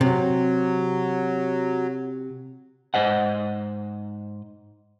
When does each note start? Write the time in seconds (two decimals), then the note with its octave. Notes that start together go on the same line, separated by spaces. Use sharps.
0.01 C3 F#3
2.94 G#2 C5 D#5 F#5